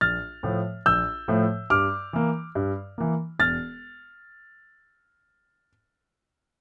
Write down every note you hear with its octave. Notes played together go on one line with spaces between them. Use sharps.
A#1 F6 A6
A2 F3 A3
A#1 E6 G6
A2 F3 A3
G2 D6 F6
E3 A#3
G2
E3 A#3
E1 F6 A6